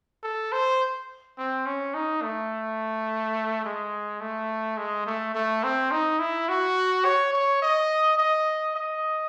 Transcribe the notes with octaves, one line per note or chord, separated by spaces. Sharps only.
A4
C5
C4
C#4
D#4
A3
G#3
A3
G#3
A3
A3
C4
D#4
E4
F#4
C#5
C#5
D#5
D#5
D#5